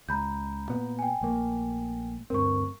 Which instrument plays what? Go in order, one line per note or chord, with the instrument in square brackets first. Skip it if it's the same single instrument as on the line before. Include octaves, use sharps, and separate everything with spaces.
[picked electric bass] C#2 [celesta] A#5 B5 G6
[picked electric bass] A#2 B3
[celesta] G5 G#5
[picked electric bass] A#1 A3 A#3
[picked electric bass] D2 G2 C4 [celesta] A#4 C#6